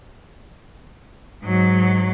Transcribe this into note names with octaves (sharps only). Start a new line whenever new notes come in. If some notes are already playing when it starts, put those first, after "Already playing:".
G#2 F#3